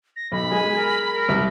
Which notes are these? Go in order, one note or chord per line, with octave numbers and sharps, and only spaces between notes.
A#6
B1 B5
G#3 G#5
A#4
A#4
C2